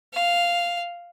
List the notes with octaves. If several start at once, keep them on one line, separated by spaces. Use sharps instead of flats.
F5